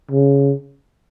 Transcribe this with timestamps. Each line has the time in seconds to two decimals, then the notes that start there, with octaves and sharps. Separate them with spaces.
0.12 C#3